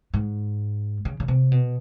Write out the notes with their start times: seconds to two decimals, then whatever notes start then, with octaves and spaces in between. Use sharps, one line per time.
0.14 G#2
1.05 C#3
1.20 C#3
1.28 C3
1.52 B2